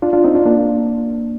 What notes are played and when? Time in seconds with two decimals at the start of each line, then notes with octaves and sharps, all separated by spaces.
0.02 D4 F4
0.13 D4 F4
0.24 C4 D#4
0.35 D4 F4
0.45 A#3 D4